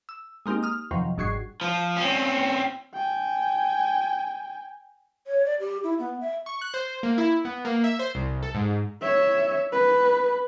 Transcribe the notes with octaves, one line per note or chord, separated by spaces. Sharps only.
E6
G#3 A#3 C4 D#4 G4
D#6 F6
F2 C3 D#3 F3 F#3
G1 G#2 F#4 C#6 G#6 C7
F3
C4 C#4
G5 G#5
C#5
D5
G4
E4
B3
E5
C#6
F#6
C5
A#3
E4
B3
A#3
E5
C5
C2
A4
G#2
C#5 E5
B4